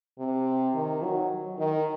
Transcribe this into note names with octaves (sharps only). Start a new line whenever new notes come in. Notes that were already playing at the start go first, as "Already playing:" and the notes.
C3
D#3
F#3
D#3